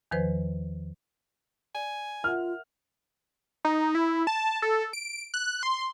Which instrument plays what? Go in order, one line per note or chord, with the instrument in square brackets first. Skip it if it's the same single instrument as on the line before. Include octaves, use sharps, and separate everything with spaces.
[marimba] E2 D#3 F3 B4 C5
[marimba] D5 [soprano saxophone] G#5
[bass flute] F4 [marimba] A#4 E5 F#5 [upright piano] F6
[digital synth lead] D#4
E4
A5
A4
D7
F#6
C6